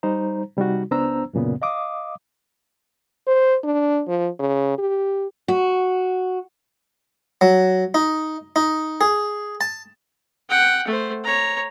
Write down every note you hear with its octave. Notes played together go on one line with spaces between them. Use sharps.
G3 D#4 C5 A#5
C3 G3 D#4 F#4
C#2 B3 D4 C5 A#5 E6
C2 F#2 A#2 C#3 B3
D#5 F5 D6 D#6
C5
D4
F3
C#3
G4
F#4
F#3
D#4
D#4
G#4
A5
F#5 G5
A3 C5
C#5 A#5